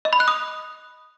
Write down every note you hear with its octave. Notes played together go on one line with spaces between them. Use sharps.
D#5
B5
F#6
D#6